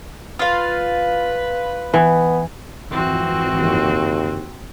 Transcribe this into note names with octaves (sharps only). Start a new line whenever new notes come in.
F4 B4 F5
E3 B3
G#1 F2 E3 C4 F#4
F#1 D#2